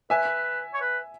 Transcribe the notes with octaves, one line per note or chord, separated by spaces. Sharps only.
B4 E5 G#5
C#5
B4